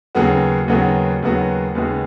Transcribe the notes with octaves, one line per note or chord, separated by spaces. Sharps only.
D#2 C#3 F#3 B3 F#4
D#2 C#3 F#3 B3 F#4
D#2 C#3 F#3 B3 F#4
D#2 C#3 G#3 B3 F#4